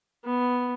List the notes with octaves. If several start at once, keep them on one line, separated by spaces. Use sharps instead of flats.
B3